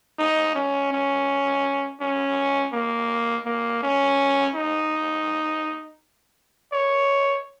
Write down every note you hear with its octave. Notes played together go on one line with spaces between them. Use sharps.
D#4
C#4
C#4
C#4
A#3
A#3
C#4
D#4
C#5